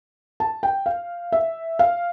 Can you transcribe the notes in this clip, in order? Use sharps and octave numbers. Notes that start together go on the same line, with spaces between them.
A5
G5
F5
E5
F5